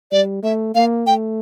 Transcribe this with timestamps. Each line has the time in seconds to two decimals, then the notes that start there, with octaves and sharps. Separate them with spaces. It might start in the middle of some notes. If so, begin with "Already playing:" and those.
0.12 G3 D5
0.43 A3 E5
0.75 A#3 F5
1.07 A3 G5